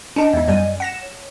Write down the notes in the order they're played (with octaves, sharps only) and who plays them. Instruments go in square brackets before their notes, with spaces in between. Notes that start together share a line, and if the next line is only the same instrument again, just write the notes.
[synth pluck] C#4 D4 [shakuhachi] D#5
[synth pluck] E2 G#2
F#2 G3 G#5
F#5 A#6 E7
[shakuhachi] C#5